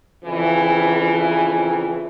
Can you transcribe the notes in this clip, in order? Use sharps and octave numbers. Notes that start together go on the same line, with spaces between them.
F2 C#3 E3